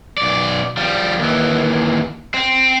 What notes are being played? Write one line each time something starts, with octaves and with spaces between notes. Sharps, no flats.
B1 D5
F3 G3
D#2 E3
C4